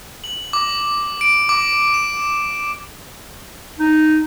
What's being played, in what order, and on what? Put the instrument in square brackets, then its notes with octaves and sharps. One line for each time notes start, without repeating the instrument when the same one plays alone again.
[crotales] F#7
D6
D7
D6
E7
[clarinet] D#4